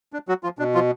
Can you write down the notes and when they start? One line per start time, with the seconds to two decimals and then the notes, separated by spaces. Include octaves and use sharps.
0.13 D4
0.28 F#3 F#4
0.43 F3 F4
0.59 B2 D4
0.75 F3 F4